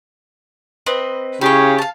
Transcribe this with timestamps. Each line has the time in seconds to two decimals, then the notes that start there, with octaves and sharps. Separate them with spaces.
0.86 C4 B4 D#5
1.41 C#3 E4 F4 G4 C#5
1.78 F5 A5